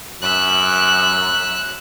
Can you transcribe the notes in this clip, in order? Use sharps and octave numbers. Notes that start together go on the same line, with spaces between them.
F#2 E5 F#6